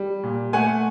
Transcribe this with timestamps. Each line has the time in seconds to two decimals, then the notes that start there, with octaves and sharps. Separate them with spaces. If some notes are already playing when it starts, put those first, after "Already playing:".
Already playing: G3
0.23 A#2
0.53 A3 F#5 G#5